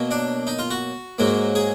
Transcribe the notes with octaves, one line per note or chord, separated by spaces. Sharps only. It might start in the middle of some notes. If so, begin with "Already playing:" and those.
Already playing: B2 F#3 A#3
D4
D#4
F4
F#4
G#2 F#3 A#3
G#4